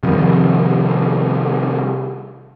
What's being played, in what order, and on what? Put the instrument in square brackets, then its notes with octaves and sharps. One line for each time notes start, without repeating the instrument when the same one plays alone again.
[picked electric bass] C3 D#3 F3 G3